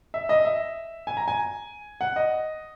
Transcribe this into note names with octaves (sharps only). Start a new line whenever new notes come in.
E5
D#5
E5
G#5
A#5
G#5
F#5
D#5